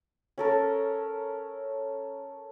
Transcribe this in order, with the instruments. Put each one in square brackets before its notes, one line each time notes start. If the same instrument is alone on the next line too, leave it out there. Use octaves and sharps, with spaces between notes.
[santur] C#4 A4 A#4